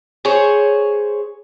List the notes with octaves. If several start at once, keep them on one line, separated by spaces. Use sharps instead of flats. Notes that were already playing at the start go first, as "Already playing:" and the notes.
G#4 C5 C#5